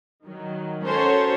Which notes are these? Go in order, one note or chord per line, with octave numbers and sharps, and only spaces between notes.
D#3 F#3
C#4 F#4 A4 A#4 C5 C#5